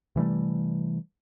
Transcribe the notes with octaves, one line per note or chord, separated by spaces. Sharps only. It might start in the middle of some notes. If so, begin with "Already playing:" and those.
C3 E3 G3 A3